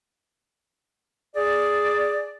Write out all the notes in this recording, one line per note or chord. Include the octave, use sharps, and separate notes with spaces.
G#4 D5